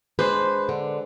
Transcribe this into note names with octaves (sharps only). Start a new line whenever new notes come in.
G#3 D4 B4 C5
D3